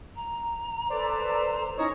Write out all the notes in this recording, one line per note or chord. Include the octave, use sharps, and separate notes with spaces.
A#5
A4 B4 C5 D5
C#4 D#4 E4 C#5 D#5 D#6